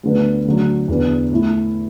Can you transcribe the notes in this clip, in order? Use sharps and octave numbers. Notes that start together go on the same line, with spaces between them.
D2 D3 B3
D2 D3 F#3
E2 D3 B3
A2 A3 E4